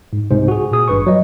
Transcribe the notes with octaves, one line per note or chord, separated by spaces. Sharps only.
G#2
C2 G#2 C3 C5
F#4 G#4
A#2 G#4 D#6
G#1 G2 B4 C#6
F#3 D#5